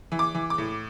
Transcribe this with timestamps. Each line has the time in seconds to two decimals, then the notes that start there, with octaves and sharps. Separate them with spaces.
0.12 E3
0.19 D6
0.34 E3
0.50 D6
0.58 A2